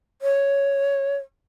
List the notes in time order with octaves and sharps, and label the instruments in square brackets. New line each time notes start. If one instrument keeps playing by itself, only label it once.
[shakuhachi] C#5